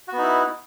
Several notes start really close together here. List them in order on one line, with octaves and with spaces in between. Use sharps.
F#4 B3 D#4 E4